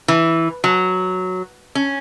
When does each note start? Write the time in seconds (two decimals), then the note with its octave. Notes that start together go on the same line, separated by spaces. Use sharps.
0.08 E3
0.64 F#3
1.75 C#4